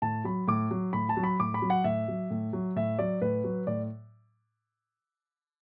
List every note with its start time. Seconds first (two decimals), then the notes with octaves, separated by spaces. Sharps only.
0.02 A2 A5
0.24 F#3 B5
0.48 A2 D6
0.71 F#3
0.93 A2 B5
1.09 A5
1.17 F#3
1.23 B5
1.40 A2 D6
1.54 B5
1.62 F#3
1.70 F#5
1.84 A2 E5
2.08 F#3
2.31 A2
2.53 F#3
2.76 A2 E5
2.99 F#3 D5
3.21 A2 B4
3.44 F#3
3.67 A2 D5